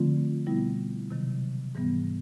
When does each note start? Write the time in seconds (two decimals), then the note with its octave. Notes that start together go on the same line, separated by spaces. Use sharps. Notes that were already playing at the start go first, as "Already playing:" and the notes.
Already playing: D3 F3 A3 C4 F4
0.46 B2 G3 B3 E4
1.11 C3 D#3 F#3
1.75 G#2 E3 G3 B3